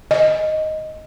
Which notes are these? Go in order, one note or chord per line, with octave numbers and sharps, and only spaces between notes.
D#5